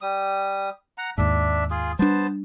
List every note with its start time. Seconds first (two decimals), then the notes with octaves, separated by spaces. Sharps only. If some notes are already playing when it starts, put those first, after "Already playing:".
0.01 G3 D#6
0.98 F#5 A#5
1.18 D#2 G#2 D4 E5
1.70 F4 G#4
1.99 G3 B3 D4 C5 A5